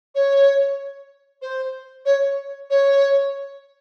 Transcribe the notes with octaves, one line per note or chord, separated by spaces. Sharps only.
C#5
C5
C#5
C#5